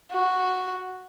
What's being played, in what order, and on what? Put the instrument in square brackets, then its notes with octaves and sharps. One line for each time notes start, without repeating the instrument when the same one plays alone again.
[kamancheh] F#4